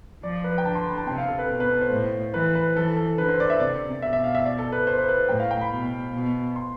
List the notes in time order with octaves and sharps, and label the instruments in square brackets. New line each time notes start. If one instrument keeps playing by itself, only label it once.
[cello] F3 [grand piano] D5
[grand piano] B4
G5
[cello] D3 [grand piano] A5
[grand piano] C6
B5
A5
[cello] C3 [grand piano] G5
[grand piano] F5
A4
B4
[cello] B2 [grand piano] B4
[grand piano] B4
A4
C5
[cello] A2
[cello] E3 [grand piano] B4
[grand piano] B4
[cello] E3 [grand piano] A4
[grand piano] A4
[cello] D3 [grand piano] B4
[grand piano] C5
D5
E5
[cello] C3 [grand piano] D5
[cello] B2 [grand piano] E5
[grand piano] E5
F5
E5
D5
A4
B4
C5
B4
B4
C5
[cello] A2 [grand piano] G5
[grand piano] F5
G5
B5
[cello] B2
B2
[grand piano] C6